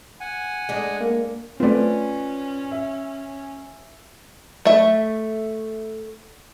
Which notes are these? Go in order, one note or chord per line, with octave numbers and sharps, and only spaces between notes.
F#5 G#5
G#3 D4
A#3
A3 C4 C#4 F4 B4 D5
E5
A3 E5